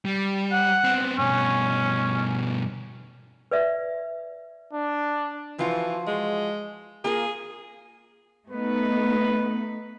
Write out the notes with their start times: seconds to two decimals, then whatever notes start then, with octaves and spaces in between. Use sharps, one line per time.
0.05 G3
0.52 F#5
0.84 B3 C4
1.18 G2 B2 C#4
3.51 B4 D5 E5
4.73 D4
5.59 E3 F3 F4 F#4
6.07 G#3
7.04 A#3 F4 G#4 A#4
8.50 A3 B3 D#4 B4